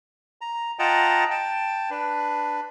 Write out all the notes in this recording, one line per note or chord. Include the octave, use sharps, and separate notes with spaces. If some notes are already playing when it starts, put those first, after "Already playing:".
A#5
F4 D#5 F#5 G5 A5 A#5
G5 A5
D4 B4